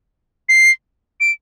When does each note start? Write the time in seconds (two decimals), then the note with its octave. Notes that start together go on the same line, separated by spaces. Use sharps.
0.49 C7
1.20 D7